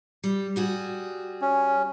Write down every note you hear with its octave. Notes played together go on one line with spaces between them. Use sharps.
G3
G3 F#4 G#4
C#4